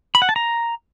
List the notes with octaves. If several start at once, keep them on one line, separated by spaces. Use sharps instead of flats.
B5
F#5
A5
A#5